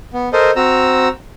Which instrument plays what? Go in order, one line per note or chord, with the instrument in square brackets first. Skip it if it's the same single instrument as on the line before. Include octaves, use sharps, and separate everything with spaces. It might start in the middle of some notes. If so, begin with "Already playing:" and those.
[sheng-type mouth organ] B3
A4 A#4 C5 D#5
C4 F#4 A#5 E6